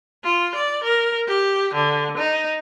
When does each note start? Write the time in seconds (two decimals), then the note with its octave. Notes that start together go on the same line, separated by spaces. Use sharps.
0.24 F4
0.55 D5
0.84 A#4
1.27 G4
1.74 D3
2.17 D#4